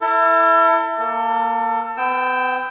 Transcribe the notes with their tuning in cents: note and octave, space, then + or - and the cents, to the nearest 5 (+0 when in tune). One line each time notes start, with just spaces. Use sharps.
E4 +0 A4 +35
A#3 +0 A4 +30
B3 +40 G5 +0 E6 +0